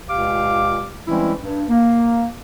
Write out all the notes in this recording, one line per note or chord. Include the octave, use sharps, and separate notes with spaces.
C#2 A#2 G4 F5 D6
E3 G3 G#3 C4 C#4 E4
G2
A#3